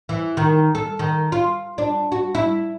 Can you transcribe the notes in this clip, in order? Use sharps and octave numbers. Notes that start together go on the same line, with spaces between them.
E3
D#3
A4
D#3
F4
D4
F#4
E4